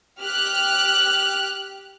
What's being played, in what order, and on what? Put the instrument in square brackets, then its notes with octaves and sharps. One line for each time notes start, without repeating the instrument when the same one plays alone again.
[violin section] G4 F6 F#6